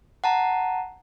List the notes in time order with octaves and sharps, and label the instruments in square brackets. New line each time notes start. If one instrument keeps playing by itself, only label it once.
[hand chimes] F#5 A5 A#5